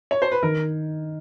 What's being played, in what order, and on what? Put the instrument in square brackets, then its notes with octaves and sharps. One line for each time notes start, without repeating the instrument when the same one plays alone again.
[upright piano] C#5
C5
B4
[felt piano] D#3 [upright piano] A#4